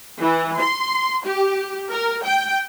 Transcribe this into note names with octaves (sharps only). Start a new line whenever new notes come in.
E3
C6
G4
A#4
G5